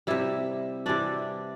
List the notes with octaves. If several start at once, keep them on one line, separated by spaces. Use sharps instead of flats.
C3 G3 E4 E5
C3 E3 G3 D4 D5